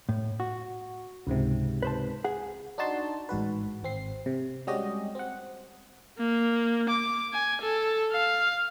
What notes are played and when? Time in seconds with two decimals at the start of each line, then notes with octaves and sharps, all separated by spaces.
0.09 A2
0.40 F#4
1.27 C#2 G#2 C3
1.83 B4 C5 A5
2.25 G#4 F#5
2.78 D4 D#4 F#4 A5 C6
3.29 A1 G#2 F#4 B4
3.83 G#1 C4 C7
4.26 C3
4.67 G3 G#3 C#4 F#4 G4 D#5
5.15 C4 F#5
6.18 A#3
6.89 D6
7.33 G#5
7.62 A4
8.12 F5